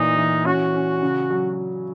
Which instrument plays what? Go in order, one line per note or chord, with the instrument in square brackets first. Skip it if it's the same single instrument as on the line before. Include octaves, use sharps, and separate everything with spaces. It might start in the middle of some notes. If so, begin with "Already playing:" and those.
Already playing: [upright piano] A#2 E3 [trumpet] D#4
[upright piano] E3
[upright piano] C#4 [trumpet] F#4
[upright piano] C#4
C#3
F#3